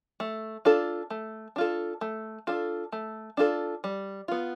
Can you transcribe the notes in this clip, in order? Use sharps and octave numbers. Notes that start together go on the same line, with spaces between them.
A3
D4 F4 A4
A3
D4 F4 A4
A3
D4 F4 A4
A3
D4 F4 A4
G3
B3 F4